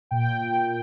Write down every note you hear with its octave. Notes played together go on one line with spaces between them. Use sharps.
A#2 G5
A#2